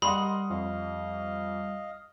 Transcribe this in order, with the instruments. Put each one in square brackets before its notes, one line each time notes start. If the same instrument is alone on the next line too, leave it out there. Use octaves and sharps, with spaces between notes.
[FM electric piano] G3 [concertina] A#4 D#5 [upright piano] F#5 C6 D#6 [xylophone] B5
[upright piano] F2 [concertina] D#5 F5